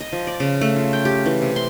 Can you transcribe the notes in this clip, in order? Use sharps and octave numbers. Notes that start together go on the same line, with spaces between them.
D#5
F3
D5
C#3
A3
F4
G5
G4
E3
C3
C6